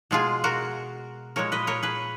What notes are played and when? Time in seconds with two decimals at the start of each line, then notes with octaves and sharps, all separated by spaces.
0.11 B2 G#3 F4 G#4
0.44 F#4 A#4
1.36 A#2 G#3 A#4 C#5
1.52 B4 D#5
1.67 A#4 C#5
1.82 G#4 B4